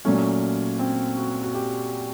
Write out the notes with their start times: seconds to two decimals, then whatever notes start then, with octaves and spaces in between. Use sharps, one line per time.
0.05 A#2 F#3 A3 C#4
0.79 C4
1.18 F#4
1.43 F#4
1.55 G4